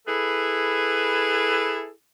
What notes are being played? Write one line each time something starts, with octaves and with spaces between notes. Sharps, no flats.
E4 G#4 A4 B4